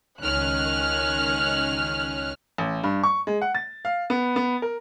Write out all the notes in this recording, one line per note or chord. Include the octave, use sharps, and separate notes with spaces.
C#2 D#3 C#4 F6 F#6
A1
G2
C#6
G#3
F#5
A6
F5
B3
B3
A#4